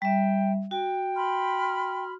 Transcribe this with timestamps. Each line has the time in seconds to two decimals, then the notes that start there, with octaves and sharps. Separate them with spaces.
0.02 G3 E5 G5
0.71 F#4 G5
1.16 B5 C6 F6